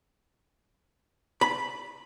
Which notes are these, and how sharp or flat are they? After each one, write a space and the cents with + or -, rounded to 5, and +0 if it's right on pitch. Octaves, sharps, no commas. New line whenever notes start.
B5 -5